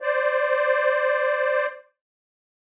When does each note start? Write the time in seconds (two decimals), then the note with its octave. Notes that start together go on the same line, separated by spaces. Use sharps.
0.01 C5 D5